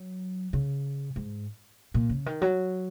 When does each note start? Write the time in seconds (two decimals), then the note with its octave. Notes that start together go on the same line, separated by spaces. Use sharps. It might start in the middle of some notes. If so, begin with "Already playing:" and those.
Already playing: F#3
0.53 C#3
1.16 G#2
1.94 A#2
2.09 C#3
2.26 D#3
2.42 F#3